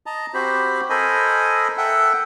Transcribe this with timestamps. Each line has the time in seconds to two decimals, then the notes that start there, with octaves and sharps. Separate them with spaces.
0.06 D#5 A5 A#5
0.34 C4 F#4 G4 C5 B5
0.90 A4 A#4 C5 D#5 G#5 B5
1.78 A4 E5 F#5 G5